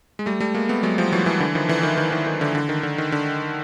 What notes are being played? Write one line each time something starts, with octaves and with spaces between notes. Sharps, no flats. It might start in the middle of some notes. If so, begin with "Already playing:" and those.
G#3
G3 A3
G3 A3
G#3 A#3
A3 B3
F#3 G#3
F3 G3
E3 F#3
E3 F#3
D3 E3
D#3 F3
D3 E3
D#3
D#3
D#3
D#3
D3
D3
D#3
D3
D#3
D3